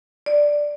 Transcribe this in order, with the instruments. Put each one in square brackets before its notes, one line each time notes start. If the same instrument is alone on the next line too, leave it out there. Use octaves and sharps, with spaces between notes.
[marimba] D5